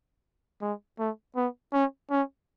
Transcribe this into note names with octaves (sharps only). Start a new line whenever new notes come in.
G#3
A3
B3
C#4
C#4